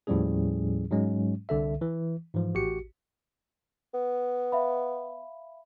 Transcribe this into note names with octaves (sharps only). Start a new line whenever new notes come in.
D#2 A2 F3 G3 C#4 G#4
G#2 F#3 G#3 C#4
C2 D3 A4 E5
E3
G#2 E3 F3
A1 F#4 G4 C#7
B3
E5 F5 B5